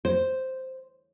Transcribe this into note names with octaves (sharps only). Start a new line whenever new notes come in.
C5